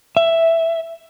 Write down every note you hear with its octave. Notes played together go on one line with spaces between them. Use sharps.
E5